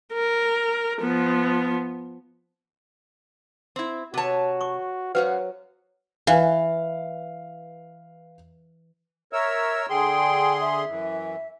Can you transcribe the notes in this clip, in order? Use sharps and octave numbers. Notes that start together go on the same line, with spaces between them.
A#4
F3 B3
C4 E4
C3 F#4 B4 C#5 A5
C#6 D6
F#2 F#3 F#4 B4 C5 F5 F#5
E3 B4 F5
A#4 C#5 E5 E6
D3 G#4 G5 C6
E5
F#2 E3